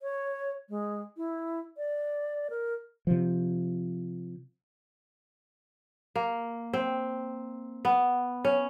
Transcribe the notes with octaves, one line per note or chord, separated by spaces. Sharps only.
C#5
G#3
E4
D5
A#4
C3 F3
A#3
C4
B3
C#4